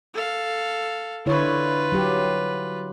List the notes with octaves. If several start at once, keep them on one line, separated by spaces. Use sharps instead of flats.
A4 F5
D3 E4 F4 B4 C#5
F#3 G4